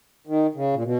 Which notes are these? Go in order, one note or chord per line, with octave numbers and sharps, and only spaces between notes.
D#3
C#3
A#2
B2